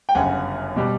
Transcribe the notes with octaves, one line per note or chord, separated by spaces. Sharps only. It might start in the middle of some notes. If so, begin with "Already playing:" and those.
G5
G1 F#2 C#3 F#5 G#5
B2 G3